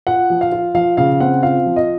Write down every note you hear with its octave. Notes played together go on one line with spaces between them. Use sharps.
F4 F#5
F3
F5
F4
F3 F5
C#3 F5
C4 F#5
F4 F5
F3
D#5